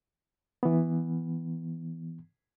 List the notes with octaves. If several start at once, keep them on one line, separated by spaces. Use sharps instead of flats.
E3 B3